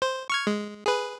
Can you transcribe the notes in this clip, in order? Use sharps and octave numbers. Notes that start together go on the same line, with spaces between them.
C5
C#6 F6 G#6
G#3
G#4 B4